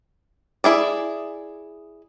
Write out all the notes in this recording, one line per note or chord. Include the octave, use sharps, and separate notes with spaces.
E4 G#4 D5